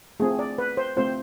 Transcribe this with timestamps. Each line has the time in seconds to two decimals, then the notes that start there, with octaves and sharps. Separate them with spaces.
0.20 A3 C4 F4 G#4
0.39 D5
0.58 B4
0.77 C5
0.97 A3 C4 F4 C5